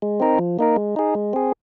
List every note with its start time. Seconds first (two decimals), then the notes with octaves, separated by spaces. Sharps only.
0.02 G#3
0.20 C4 D#4 A#4
0.39 F3
0.59 A#3 D#4 A#4
0.76 G#3
0.96 D#4 G#4
1.15 G#3
1.33 C4 G#4